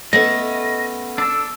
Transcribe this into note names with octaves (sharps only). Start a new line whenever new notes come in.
A3 B3 C#4 D#5
D4 A4 E6